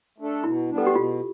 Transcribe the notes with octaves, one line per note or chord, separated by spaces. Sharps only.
A3 D4 A4
B2 E4
G3 B3 D4
A4
G4
B2 F4